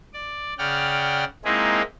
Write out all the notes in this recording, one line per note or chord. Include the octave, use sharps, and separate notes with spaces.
D5
C#3 D5 F#5 G5 F6
G#3 A#3 C4 D#4 E4 G#4